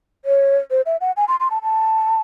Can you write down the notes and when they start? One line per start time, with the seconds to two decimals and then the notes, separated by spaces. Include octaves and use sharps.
0.25 C#5
0.71 C5
0.86 E5
1.01 F#5
1.17 G#5
1.28 C6
1.40 C6
1.51 A5
1.63 A5